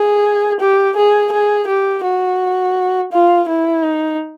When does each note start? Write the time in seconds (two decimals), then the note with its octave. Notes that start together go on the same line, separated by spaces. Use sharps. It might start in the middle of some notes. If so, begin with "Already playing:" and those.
Already playing: G#4
0.60 G4
0.96 G#4
1.32 G#4
1.68 G4
2.04 F#4
3.12 F4
3.48 E4
3.84 D#4